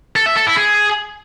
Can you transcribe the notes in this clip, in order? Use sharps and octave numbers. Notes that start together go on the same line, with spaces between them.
A4
E5
A4
E4
G#4